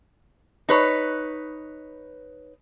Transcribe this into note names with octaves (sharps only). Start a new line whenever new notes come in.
D#4 B4 C#5